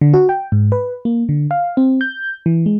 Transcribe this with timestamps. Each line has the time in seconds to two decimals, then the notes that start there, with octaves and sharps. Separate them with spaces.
0.01 D3
0.14 F#4
0.29 G5
0.52 G#2
0.72 B4
1.05 A#3
1.29 D3
1.51 F5
1.77 C4
2.01 G6
2.46 E3
2.66 G#3